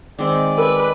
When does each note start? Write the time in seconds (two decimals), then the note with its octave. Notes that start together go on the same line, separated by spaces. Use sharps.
0.19 D#3 G#3 C4 D5
0.58 A#4 B4 D6